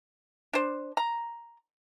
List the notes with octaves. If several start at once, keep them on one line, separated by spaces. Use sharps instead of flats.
D4 C5
A#5